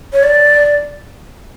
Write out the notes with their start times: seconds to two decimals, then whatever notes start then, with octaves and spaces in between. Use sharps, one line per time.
0.13 C#5
0.23 D5